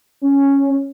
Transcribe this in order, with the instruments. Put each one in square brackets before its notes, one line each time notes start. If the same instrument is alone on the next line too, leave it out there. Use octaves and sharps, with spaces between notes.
[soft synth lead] C#4